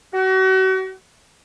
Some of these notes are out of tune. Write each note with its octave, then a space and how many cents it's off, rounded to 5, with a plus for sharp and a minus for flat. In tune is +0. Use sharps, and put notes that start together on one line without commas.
F#4 +35